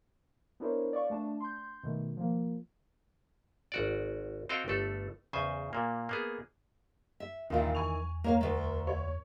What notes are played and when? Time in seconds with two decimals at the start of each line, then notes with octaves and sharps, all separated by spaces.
0.60 B3 D4 E4 A#4 C5 C#5
0.93 D5 F5 C#6
1.10 A3 D4 A5
1.40 C6 G6
1.83 B2 D#3 A3
2.17 F3 A#3
3.72 G#1 F#4 D5
4.49 C4 F#4 A4 D#5 F5 G5
4.68 G1 A3 A4
5.33 E2 C#3 C5 G#5
5.73 A#2 A#3
6.09 A#3 B3 G#4
7.20 E5
7.50 D#2 A#2 D#3 E3 F4 E5
7.75 E2 G#5 C#6 F7
8.24 A#3 A#4 C#5 F5
8.41 D2 A3
8.87 C#5